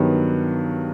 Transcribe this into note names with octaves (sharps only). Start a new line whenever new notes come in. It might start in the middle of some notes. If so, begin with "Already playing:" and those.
Already playing: G2 D#3 F#3 B3